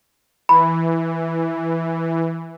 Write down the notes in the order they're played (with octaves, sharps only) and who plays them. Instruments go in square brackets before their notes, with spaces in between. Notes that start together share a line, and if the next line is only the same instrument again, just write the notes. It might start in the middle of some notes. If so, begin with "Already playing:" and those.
[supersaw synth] E3 [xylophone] B5